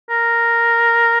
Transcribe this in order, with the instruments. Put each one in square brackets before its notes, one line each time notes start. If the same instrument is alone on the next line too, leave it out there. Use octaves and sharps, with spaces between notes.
[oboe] A#4